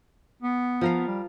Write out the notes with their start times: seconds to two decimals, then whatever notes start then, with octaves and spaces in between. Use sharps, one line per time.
0.43 B3
0.81 F3 A#4 F5
1.07 G3